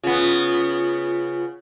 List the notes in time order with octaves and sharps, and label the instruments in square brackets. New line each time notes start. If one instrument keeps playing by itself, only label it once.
[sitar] C#3 B3 [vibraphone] F4